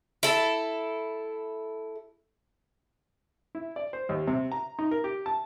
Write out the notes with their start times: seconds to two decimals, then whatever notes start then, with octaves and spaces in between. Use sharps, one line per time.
0.23 E4 A4
3.55 E4
3.76 D5
3.93 C5
4.09 D#2
4.28 C3
4.52 A#5
4.79 D#4
4.91 A#4
5.04 G4
5.26 A5